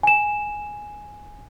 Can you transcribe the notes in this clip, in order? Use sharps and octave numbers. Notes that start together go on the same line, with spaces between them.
G#5 E7